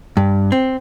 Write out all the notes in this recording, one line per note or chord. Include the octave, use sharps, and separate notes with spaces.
G2
C4